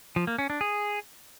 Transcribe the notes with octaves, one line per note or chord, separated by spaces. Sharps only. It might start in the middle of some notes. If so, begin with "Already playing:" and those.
F3
A#3
C#4
D4
G#4